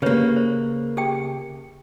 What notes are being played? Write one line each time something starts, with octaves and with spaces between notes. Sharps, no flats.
C#3 A#3 G4 B4 C#5
C5
G4 G#4 G5